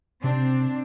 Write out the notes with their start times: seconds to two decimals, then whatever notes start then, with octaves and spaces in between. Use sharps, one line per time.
0.24 C3 C4 D4